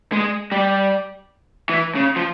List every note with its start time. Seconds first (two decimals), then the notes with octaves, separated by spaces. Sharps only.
0.12 G#3
0.52 G3
1.69 E3
1.95 C#3
2.16 F3